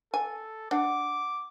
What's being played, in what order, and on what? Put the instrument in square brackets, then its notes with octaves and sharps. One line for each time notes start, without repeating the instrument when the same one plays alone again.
[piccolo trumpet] A4 [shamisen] G#5
[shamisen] D4 [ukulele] F#5 [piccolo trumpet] D6